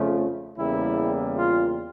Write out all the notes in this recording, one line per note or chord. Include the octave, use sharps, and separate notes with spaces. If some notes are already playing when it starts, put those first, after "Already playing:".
Already playing: F2 C#3 F3 A3
E2 C#3 G3 A#3 E4
F4